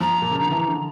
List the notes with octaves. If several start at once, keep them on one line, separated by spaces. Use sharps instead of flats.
F3 A#5
A#2
C#3
D3
E3
D3